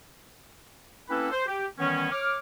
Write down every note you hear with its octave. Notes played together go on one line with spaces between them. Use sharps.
A#3 C4 C#4 E4 A4 B4
C5
G4
D#3 E3 G3 B3 C#4
C#5 D6 F6